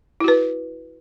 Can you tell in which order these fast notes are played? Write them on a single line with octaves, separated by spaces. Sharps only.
E4 F#4 B4